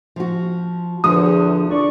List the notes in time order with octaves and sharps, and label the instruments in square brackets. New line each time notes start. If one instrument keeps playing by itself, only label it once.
[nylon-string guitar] F3 F#4
[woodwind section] E2 [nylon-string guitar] D3 F3 F#4 [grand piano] D#6
[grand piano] D4 [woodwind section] D5 C#6